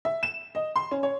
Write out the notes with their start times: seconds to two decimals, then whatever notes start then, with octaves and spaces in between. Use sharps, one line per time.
0.05 E5
0.23 E7
0.55 D#5
0.76 C6
0.91 C#4
1.03 C#5